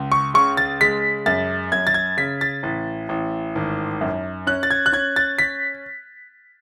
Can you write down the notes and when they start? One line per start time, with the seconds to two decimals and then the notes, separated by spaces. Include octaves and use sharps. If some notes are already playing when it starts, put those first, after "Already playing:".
Already playing: C#2
0.12 C#6
0.34 C#3 C#6
0.57 A6
0.81 G#3 B6
1.26 F#2 A6
1.72 F#2 G#6
1.87 A6
1.94 G#6
2.17 C#3 B6
2.41 A6
2.63 A1
3.09 A1
3.55 G#1
4.01 F#2
4.47 C#4 F#6
4.63 A6
4.71 G#6
4.86 F#6
4.92 C#4 G#6
5.16 A6
5.39 B6